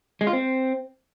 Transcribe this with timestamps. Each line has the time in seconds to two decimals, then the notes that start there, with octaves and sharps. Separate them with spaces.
0.21 G#3
0.27 F4
0.33 C4